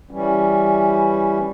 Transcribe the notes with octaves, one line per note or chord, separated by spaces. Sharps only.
E3 G3 C#4